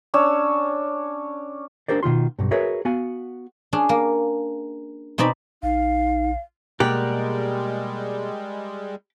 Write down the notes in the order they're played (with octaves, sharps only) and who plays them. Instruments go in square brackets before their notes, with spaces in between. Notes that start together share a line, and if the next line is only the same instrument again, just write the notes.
[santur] C#4 D4 C#5 E6
[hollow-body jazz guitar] D4 F#4 G4 A#4 C5 D5
B2 D#3 F4 C6
B1 G2
F#4 G#4 A#4 B4 C#5 E5
B3 F#4 F5 G#5
[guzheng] C#4 D4 G#4
A#3
B2 C4 D#4 D5 B5
[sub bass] A#1 [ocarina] D#4 [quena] F5
[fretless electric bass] B2 A#3 [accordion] G3 G#3 [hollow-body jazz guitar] G4 [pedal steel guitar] A#4 D5 F#5